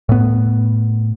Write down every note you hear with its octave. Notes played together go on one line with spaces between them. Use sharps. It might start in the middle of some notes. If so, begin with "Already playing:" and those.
A2 B3